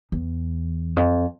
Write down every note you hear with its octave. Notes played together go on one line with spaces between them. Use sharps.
E2
F2